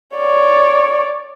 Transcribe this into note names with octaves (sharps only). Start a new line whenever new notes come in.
C#5 D5